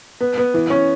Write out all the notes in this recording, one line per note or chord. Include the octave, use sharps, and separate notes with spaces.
B3
B3
E3
C#4